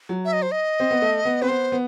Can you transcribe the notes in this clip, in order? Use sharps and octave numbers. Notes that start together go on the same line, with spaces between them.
F#3
E5
D#5
C5
D#5
C4
B3
A3
B3
C4 B4
B3 C5
B3